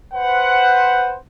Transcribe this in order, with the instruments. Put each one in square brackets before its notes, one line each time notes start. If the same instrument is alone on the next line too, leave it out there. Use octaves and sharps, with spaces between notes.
[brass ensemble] B4 C5 F#5